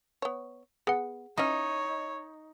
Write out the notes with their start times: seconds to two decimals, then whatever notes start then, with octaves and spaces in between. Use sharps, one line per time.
0.22 B3 C#5
0.87 B3 G#4 F#5
1.38 C#4 D#4 E4 C#5